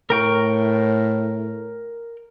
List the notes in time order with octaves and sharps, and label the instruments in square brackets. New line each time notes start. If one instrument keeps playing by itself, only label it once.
[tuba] A2 [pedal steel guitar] A#4 G5 C#6